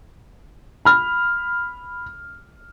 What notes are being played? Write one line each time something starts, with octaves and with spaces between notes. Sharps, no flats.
B5 F6